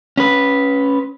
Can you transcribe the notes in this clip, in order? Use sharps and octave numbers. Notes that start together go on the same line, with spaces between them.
C#4 B4